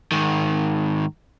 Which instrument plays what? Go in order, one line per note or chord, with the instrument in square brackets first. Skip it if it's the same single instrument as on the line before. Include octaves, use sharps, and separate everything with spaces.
[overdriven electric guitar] G#2 D#3